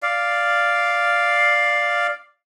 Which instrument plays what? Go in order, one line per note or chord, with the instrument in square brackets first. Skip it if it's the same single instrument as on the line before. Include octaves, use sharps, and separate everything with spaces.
[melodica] D5 F5